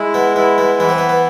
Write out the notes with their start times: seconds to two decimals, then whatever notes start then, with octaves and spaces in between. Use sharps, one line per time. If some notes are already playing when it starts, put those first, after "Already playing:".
Already playing: G#3 E4
0.14 B3
0.36 B3 E4
0.58 B3
0.79 E3 B3
0.89 C4
0.98 B3
1.09 B3